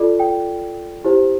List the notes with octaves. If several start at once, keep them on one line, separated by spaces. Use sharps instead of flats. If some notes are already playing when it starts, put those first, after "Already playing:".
Already playing: F4 A4 D5
G5
E4 G4 C5